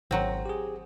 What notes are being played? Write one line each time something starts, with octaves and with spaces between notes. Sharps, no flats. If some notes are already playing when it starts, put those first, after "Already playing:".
G#1 F#3 C4
G4 G#4